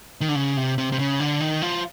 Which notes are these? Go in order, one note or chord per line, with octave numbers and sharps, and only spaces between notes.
D#3
D3
C#3
C3
C3
C3
C#3
D3
D#3
F3